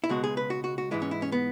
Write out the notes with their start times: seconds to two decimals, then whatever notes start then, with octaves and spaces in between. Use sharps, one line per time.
0.04 E4
0.09 C#2 B2 G#3 F#4
0.24 G#4
0.37 B4
0.50 F#4
0.64 F#4
0.78 F#4
0.91 G#2 E3 G#3 E4
1.02 C#4
1.11 E4
1.22 C#4
1.32 B3